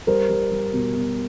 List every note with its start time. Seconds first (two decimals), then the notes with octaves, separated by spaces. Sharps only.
0.07 G3 A#4 C5
0.29 G3
0.51 G3
0.73 B2
0.95 B2